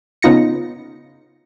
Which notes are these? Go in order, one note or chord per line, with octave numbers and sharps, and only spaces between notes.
C#3 B3 D#4 F4 A#6 C#7